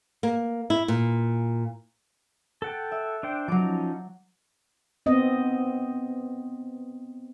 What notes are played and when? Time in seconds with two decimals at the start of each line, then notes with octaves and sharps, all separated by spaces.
0.23 A#3
0.70 E4
0.88 A#2
2.62 A4 F#5 G5 A6
2.92 E5
3.23 D4 C5 G5
3.48 F3 F#3 C#4 D#4 D6
5.06 B3 C4 D#5